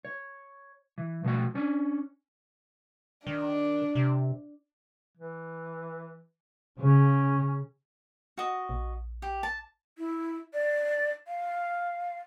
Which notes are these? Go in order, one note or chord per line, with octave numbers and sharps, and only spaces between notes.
C#5
E3
B2 F3 A3 F#4 F#5
C#4 D4 C#5
D#3 D4
C3
E3
C#3 C#4
F#4 D#5
A#1
G4
A5
E4
D5
F5